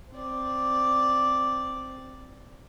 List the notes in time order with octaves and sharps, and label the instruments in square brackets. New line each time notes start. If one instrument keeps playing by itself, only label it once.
[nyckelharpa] C4 D5